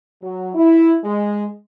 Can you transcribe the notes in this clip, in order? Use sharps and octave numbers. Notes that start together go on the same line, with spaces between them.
F#3
E4
G#3